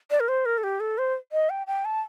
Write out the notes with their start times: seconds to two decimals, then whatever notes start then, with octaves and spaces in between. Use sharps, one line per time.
0.11 D5
0.20 A#4
0.28 C5
0.46 A#4
0.58 A4
0.64 G4
0.80 A4
0.98 C5
1.32 D#5
1.50 G5
1.67 G5
1.85 A5